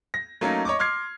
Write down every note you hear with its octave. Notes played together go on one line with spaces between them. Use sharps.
A#6
F#3 A3 A#3 C#4 D#4
C#5 D#5 C#6 D6
C6 D6 F6 G#6 C7